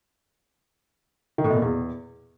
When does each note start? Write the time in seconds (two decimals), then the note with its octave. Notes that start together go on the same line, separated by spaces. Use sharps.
1.38 D#3
1.44 A2
1.50 B2
1.56 A#2
1.62 E2